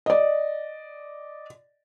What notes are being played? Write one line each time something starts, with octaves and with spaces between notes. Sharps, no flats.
D5 D#5